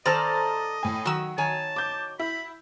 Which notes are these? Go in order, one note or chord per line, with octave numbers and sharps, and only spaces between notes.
D#3 A4 C5 D5 D#5 A5 A#5 F6
A2 G#5
D#3 F#3 F#4 E6
D#3 C#5 G#5 A5
D6 G6
E4 B5